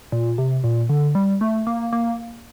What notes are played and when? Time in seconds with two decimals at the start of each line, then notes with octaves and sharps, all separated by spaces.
0.12 A#2
0.38 C3
0.64 A#2
0.89 D3
1.15 G3
1.41 A3
1.67 A#3
1.93 A#3